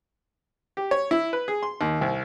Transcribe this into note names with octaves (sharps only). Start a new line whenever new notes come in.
G4
C#5
E4
B4
G#4
C6
D#2
C2